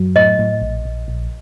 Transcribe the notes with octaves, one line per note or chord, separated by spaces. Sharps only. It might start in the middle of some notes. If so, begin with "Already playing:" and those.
Already playing: F#2 F#3
A2 D#5
A2
A#1
A#1
A#1